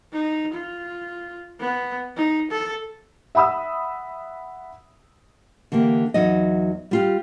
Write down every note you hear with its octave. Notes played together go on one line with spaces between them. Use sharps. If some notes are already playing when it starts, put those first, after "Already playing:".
D#4
F4
B3
D#4
A4
E5 F#5 B5 D#6 E6
D3 E3 A#3 G4
E2 F#3 D#4 D#5
G3 F4 G4